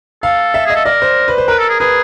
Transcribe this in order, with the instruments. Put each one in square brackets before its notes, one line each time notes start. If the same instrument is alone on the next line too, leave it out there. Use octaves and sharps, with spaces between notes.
[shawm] A4 [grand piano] F5
[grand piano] E5
[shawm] G#4 [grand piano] D#5
[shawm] A4
[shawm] A#4 [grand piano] D5
[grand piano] C5
B4
C5
[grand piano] A#4 [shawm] B4
[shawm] A4
G#4
[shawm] G#4 [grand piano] B4